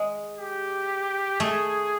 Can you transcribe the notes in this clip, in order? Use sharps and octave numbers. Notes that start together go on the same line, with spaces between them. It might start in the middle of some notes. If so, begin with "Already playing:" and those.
Already playing: G#3
G4
A3 G#4